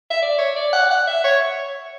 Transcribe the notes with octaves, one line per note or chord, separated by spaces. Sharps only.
E5
D5
C#5
D5
F#5
F#5
E5
C#5